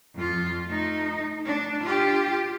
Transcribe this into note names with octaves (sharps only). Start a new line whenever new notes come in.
F2 F4
A3 D#4
D4
F4 G4